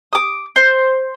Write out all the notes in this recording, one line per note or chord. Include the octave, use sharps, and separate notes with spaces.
D6 D#6
C5